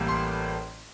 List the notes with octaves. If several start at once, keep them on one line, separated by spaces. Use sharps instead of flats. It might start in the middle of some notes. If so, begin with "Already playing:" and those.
Already playing: A1 A2 G3 A#3
C6